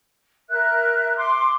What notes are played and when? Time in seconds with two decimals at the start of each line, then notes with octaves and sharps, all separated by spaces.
0.50 A#4 E5 F#6
1.17 C6 D6